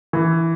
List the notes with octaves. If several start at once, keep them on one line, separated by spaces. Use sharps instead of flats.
E3